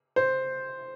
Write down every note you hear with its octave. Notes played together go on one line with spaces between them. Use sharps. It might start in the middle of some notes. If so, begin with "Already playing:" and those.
C5